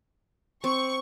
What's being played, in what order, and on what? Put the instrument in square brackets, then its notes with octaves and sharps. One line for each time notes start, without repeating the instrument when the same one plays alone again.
[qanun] C4 [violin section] C#6